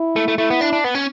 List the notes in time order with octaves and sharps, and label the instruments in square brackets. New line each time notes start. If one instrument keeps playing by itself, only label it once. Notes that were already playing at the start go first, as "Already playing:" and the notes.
Already playing: [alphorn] E4
[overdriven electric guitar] A3
A3
[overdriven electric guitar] A3 [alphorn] E4
[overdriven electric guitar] B3
D4
D4
B3
C#4